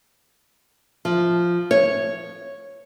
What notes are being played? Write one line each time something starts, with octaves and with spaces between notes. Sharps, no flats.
F3
C#5